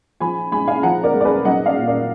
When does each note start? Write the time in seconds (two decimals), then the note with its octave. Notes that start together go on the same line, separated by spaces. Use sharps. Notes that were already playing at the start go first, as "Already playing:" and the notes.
0.20 F3 G#5 B5
0.52 G#3 G#5 B5
0.67 F5 G#5
0.83 F3 F#5 A#5
1.03 A#4 D5
1.14 G#3
1.21 D5
1.25 G#4 B4
1.45 F#3 D#5 F#5
1.66 D5 F5
1.77 A#2
1.87 A#4 D5